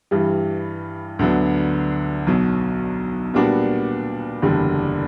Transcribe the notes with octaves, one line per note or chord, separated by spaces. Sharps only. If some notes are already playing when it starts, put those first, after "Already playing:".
G2 E3 G3
D2 D3 F#3 B3
B1 B2 F#3
A#2 G3 B3 D4 F#4
F#1 E2 D3 G3